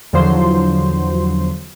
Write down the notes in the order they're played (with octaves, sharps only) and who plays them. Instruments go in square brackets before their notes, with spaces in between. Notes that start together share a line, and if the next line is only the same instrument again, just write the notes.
[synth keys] E2 D3 F3 F#3 C5 C6